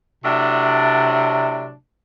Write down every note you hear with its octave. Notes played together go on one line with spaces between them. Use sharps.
A2 C3 F#3 D4